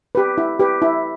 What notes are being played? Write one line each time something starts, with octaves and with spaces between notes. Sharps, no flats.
G4 B4
E4
G4 B4
E4